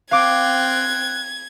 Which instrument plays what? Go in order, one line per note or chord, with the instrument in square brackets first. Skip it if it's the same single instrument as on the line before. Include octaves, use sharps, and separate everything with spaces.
[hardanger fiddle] C4 G5 [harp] F5 D6 [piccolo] F#6 [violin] G#6